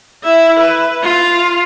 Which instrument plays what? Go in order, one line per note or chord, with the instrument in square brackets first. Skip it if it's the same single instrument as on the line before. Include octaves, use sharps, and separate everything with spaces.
[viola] E4 E5
B4
F4